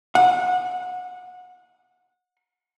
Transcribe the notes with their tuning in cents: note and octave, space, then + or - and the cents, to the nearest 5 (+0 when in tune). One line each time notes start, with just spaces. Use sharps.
F#5 -25